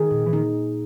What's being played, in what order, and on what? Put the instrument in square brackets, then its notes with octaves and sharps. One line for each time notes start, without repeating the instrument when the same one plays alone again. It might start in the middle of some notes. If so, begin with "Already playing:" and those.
Already playing: [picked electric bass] D#3 [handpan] G#4
[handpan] A#2
[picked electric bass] E3
[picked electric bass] D#3 [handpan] D#4